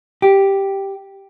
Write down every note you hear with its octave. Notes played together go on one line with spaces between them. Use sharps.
G4